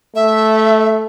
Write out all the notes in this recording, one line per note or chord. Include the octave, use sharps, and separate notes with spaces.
A3 E5